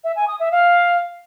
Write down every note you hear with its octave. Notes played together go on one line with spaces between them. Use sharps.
E5
G#5
D#6
E5
F5